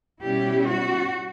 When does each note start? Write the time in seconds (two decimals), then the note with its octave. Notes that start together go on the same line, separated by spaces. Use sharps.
0.21 B2 G3 C#4 E4 G4
0.66 F#4